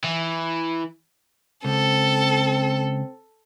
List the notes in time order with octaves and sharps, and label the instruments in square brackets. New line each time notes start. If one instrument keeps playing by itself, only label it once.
[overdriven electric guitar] E3
[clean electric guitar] C#2 [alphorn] C4 [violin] A4